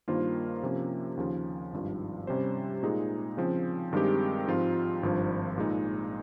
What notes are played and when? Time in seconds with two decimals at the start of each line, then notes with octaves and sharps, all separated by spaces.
0.08 G2 D#3 A#3 F4 C5
0.63 C3 F3 A#3 C#4
1.17 D#2 C#3 F3
1.73 G#1 G2 F3
2.27 C3 G3 C#4 G4 C5
2.83 A#2 G#3 D#4 G#4
3.37 C#3 F3 C4
3.92 G2 D#3 G#3 C4 G4
4.47 G#2 F3 C4 F4
5.03 G#1 G2 F3
5.58 A#2 G#3 D#4